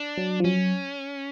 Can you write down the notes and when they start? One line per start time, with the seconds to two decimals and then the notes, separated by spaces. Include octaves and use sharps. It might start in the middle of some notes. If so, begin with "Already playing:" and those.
Already playing: D4
0.18 F#3
0.40 F3
0.44 F#3 C#4